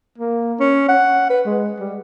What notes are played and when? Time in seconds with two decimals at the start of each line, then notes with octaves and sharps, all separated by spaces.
0.18 A#3
0.60 C#4
0.89 F#5
1.30 B4
1.46 G#3
1.80 G3